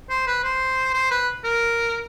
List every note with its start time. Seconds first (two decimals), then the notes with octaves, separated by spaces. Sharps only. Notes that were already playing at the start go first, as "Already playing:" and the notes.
0.09 C5
0.27 B4
0.43 C5
0.93 C5
1.11 B4
1.44 A#4